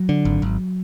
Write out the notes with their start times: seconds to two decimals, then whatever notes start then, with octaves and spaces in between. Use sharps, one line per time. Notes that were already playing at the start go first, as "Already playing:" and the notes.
Already playing: F#3
0.09 D3
0.25 G#1
0.42 G#1